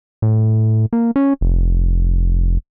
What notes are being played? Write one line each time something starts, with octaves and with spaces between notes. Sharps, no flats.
A2
A#3
C#4
F1